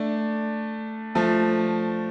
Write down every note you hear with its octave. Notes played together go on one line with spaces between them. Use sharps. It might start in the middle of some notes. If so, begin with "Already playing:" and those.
Already playing: A3 D4
F3 A3